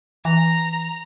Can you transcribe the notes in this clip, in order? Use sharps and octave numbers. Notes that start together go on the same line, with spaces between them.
E3 A#5